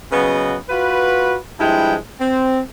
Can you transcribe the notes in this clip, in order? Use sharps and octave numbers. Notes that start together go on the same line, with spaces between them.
C#3 F#3 B3 B4 D#5
F4 F#4 B4
G2 F3 G#3 E4 G5
C4